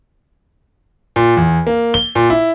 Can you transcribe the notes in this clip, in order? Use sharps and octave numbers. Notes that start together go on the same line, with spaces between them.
A#2
E2
A#3
G7
A#2
E4